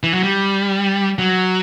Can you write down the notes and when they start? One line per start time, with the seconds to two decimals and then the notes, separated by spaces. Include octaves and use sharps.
0.03 E3
0.14 F#3
0.23 G3
1.19 F#3